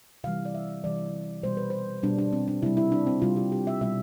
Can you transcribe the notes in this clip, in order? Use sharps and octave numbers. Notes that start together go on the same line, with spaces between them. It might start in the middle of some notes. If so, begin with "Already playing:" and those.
C3 E3 G3 F5
D5
E5
C3 E3 G3 D5
B2 G3 C5
B4
C5
B2 G3 D4
D4
C4
D4
C3 G3 E4
E4
D4
C4
C3 G3 F4
G4
G4
E5
B2 G3 E5